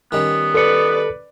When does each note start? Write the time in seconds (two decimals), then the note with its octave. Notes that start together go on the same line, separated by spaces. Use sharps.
0.12 D#3 G3 B3 C#4
0.54 A4 B4 D5 C#7